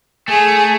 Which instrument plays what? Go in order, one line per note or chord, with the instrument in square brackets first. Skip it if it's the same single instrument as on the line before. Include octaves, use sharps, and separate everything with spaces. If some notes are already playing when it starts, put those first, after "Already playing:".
[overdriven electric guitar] A3 [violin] G#4